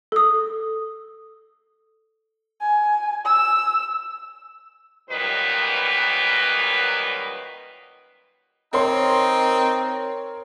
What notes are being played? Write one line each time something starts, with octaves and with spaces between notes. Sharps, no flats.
A4 D#6
G#5
E6
F#2 A#2 D#3 G3 D#4 B4
C4 D#4 A#4 C#5 C6